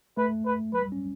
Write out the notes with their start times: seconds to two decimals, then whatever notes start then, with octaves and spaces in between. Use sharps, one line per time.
0.17 A3 B4
0.45 B4
0.73 F#3 B4
0.82 G3
0.92 C#4